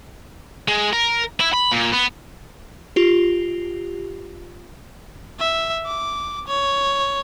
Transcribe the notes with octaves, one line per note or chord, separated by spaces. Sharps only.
G#3
A#4
E4
B5
A#2
B3
F4 G4
E5
D6
C#5